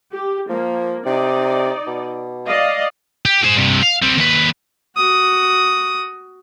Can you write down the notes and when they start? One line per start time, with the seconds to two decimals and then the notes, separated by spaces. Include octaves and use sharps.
0.13 G4
0.49 F3 A#3
1.06 C3 D#4 D5
1.87 B2
2.48 D5 D#5 F5
3.25 G4
3.43 G#4 C5
3.55 G2 C3
3.82 F5
4.02 G3 C4
4.18 D#2 B4
4.97 F#4 D#6